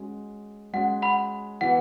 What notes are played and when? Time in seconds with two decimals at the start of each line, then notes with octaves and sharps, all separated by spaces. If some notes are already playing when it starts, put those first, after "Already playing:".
Already playing: G#3 C#4 F#4
0.73 G#3 C#4 F#4 F#5
1.02 F#5 B5
1.61 E3 B3 F#4 B4 F#5